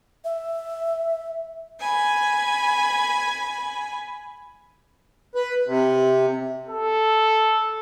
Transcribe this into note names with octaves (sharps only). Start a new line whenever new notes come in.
E5
G#5 B5
B4
C3
A4